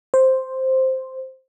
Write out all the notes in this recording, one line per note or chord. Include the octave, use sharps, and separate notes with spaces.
C5